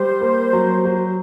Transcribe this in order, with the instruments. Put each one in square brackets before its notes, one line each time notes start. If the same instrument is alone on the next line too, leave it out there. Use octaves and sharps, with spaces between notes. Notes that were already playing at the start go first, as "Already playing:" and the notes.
Already playing: [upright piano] G3 [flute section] C5
[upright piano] A#3
F#3
F#3